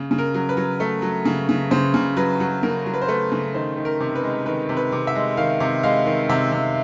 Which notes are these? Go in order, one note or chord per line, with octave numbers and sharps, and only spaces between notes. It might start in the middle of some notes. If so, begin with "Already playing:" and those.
Already playing: C#3
C#3
A#4
F#3
B4
F#3
A3
F#3
C#3
C#3
C#3 C5
C#3
F#3 B4
F#3
C#3 A#4
F#3
B4
C5
A3 B4
C#3
D#3 C5
D#3
A#4
C3
B4
G#3
D#3 B4
C3
B4
C3
E5
G#3
D#3 F5
C3
G#3 F5
D#3
C3 E5
C3